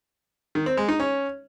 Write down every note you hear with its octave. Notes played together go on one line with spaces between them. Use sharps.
D#3
C4
G#3
D#4
C#4